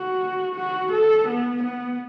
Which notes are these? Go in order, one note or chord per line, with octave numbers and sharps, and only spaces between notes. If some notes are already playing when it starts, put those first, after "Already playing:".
Already playing: F#4
F#4
A4
B3
B3